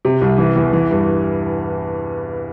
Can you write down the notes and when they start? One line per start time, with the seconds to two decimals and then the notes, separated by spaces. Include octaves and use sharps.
0.05 C3
0.21 C2
0.38 E3
0.56 E2
0.73 E3
0.91 G2